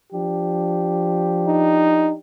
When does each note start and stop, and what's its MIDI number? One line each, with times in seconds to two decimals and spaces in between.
0.11 2.17 53
0.11 2.17 62
0.11 2.17 67
1.48 2.13 63